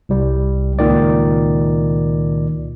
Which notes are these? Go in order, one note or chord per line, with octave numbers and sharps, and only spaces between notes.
C2 G3
C#2 A#2 D#3 D5